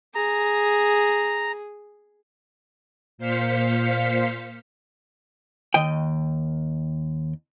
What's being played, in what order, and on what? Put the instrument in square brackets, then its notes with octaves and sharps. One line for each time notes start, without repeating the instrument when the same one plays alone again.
[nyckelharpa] G#4 [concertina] A#5
[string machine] A#2 C5 F5 B6 C#7
[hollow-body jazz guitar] D#2 D#3 D#5 G5